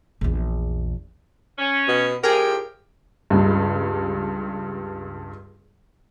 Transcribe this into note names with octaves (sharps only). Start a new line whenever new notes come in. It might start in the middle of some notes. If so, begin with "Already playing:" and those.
A#1 E2
C#4
B2
A2 F3 G4 G#4 A#4
C#2 G2